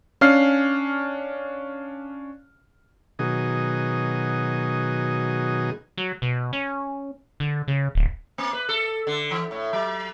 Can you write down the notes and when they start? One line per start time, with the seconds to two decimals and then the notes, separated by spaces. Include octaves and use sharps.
0.21 C#4 D4 F5 F6 C7
3.19 B2 D#3 F#3 D#4 G#4
5.97 F#3
6.22 B2
6.53 C#4
7.40 D3
7.68 C#3
7.95 D1
8.38 A#3
8.53 B4
8.69 A4
9.07 D3
9.31 E3
9.51 A2
9.73 F#3